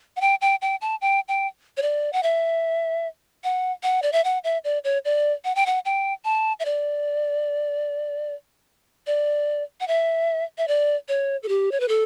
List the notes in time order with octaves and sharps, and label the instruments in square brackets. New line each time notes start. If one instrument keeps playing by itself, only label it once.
[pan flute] F#5
G5
G5
G5
A5
G5
G5
C#5
D5
F#5
E5
F#5
F#5
D5
E5
F#5
E5
D5
C#5
D5
F#5
G5
F#5
G5
A5
E5
D5
D5
F#5
E5
E5
D5
C#5
A4
G4
C#5
B4
A4